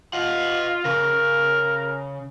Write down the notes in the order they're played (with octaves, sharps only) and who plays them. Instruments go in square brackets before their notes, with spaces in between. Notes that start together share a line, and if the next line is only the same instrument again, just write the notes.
[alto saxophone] F4 [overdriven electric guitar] D#5 F#5
[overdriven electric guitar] C#3 [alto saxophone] A#4